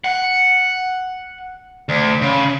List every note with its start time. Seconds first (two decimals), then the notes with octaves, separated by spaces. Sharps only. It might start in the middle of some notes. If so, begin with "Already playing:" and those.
0.04 F#5
1.89 D2
2.22 C#3